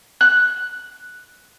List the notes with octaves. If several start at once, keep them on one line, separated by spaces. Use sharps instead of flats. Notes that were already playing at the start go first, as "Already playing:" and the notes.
F#6